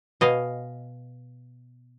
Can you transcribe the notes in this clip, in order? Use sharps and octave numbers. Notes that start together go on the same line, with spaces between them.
B2 D#5 F5 G#5